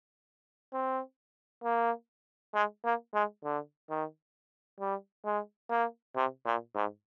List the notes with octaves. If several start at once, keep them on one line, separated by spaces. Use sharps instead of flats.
C4
A#3
G#3
A#3
G#3
D3
D#3
G3
G#3
A#3
C3
A#2
G#2